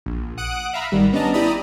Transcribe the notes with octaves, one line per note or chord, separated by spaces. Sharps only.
A#1
F#5 D#6 F#6 D7
E5 F5 A#5 B5
G#1 D#3 G3
B3 C#4 D4 D#5 A5 A#5
E4 G4 D5 A#5 B5 D#6